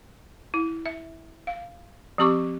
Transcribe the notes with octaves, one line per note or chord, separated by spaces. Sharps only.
E4
E5
F5
F3 C4 G4 C#6 D6